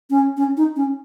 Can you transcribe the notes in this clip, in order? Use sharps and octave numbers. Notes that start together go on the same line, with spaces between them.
C#4
C#4
D#4
C#4